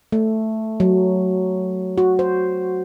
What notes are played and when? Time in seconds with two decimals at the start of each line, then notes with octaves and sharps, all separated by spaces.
0.12 A3
0.80 F#3
1.98 F#4
2.19 C5